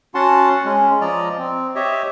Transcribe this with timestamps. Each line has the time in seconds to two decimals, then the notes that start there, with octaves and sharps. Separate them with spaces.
0.15 C#4 F#4 F#5 A5 C6
0.65 G#3 C#4
1.01 F3 D5 D#5 A#5
1.39 C4
1.75 G4 C#5 D#5 E5